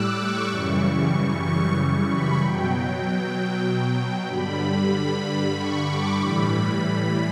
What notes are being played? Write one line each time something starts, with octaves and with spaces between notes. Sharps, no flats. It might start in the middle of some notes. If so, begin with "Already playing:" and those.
Already playing: A2 G3 D6 E6 F#6
C#6
F#2 C#3 E3 G3 C#6
C#6
C#6
B5
B2 F#3 G5
G2 D3 G3 B5
C#6
D6
A2 E3 G3 B5